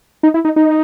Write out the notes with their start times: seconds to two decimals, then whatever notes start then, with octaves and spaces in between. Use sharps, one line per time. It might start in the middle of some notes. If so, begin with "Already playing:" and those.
0.23 D#4
0.34 E4
0.45 D#4
0.56 D#4